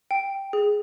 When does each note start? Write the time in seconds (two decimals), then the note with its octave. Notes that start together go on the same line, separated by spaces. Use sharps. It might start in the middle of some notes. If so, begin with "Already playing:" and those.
0.11 G5
0.53 G#4